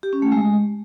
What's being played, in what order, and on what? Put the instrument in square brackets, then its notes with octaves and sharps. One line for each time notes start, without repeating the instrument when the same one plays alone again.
[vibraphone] G4
C#4
A3
G#3